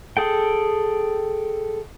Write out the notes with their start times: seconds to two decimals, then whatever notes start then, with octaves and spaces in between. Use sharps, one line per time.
0.17 G#4 A4 G5